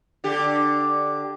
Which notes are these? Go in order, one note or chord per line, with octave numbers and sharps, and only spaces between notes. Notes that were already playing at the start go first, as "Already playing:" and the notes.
D3 G4